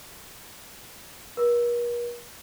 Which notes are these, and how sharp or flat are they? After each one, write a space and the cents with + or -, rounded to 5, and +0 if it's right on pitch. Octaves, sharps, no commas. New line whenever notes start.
A#4 +45